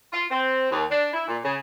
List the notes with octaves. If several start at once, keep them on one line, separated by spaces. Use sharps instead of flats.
F4
C4
D#2
D4
E4
A#2
C#3